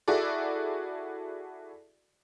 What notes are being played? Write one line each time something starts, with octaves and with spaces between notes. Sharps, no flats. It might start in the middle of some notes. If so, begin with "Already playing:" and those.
E4 F#4 G#4 A4 D5